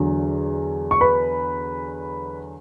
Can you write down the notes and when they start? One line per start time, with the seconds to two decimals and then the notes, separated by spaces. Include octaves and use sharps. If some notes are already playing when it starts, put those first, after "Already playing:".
Already playing: E2 D3 F#3
0.91 C#6
1.01 B4 B5